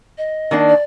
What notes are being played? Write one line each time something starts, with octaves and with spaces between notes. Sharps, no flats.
D#5
D#3 A#3 D4
D5